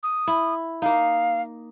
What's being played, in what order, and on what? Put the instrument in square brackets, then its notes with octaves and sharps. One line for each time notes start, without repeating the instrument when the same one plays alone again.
[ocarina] D#6
[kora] E4
[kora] A#3 D#4 [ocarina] F5